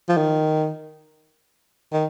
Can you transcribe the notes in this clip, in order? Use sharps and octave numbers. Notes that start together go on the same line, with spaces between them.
F3
D#3
D#3